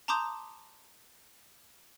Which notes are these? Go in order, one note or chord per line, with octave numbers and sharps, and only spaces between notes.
A5 A#5 C6 D6 D#6 G6